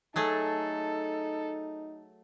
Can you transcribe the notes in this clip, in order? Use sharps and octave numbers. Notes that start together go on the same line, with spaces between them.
F#3 A3 D#4 G#4 A4